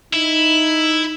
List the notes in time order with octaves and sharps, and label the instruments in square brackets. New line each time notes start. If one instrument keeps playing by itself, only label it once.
[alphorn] D#4 [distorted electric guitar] E4